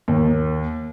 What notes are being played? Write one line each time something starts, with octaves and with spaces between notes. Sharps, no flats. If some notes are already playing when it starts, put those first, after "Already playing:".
D#2